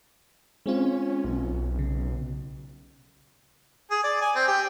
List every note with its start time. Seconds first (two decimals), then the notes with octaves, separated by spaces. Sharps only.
0.66 G#3 C4 C#4 F4
1.25 B1
1.79 C#3
3.91 G#4
4.03 D5
4.21 G#5
4.35 C4
4.47 G4